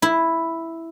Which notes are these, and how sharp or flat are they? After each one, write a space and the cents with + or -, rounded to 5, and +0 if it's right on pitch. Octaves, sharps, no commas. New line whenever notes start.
E4 +0